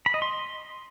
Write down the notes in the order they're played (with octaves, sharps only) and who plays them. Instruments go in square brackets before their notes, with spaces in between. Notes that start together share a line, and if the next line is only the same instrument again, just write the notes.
[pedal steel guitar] B5
D#5
C6